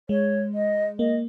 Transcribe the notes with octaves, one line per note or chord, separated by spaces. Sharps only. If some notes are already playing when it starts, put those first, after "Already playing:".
G#3 C#5
D#5
A#3 D#5